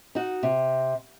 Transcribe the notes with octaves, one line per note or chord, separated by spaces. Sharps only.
D#4 F#4
C3